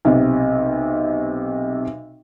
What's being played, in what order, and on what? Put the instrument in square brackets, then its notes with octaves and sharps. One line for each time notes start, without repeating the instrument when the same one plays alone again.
[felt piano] B1 C3